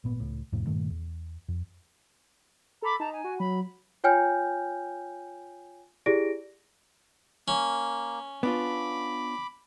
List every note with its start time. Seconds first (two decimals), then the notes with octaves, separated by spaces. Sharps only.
0.04 G#1 A#2 B3
0.20 C#2 A2
0.53 C2 F2 A2
0.67 G2 A#2 D#3 A3
0.90 E2
1.48 F2
2.82 A4 A#5 B5 D6
3.00 D#4 A5 A#5
3.12 G#5
3.24 F#4
3.40 F#3 B5
4.04 F4 C#5 G5 G#5 F6 G6
6.06 E4 G4 G#4 D5 A#6 D7
7.48 A#3 C#4
8.43 B3 D4 F4 B5 D6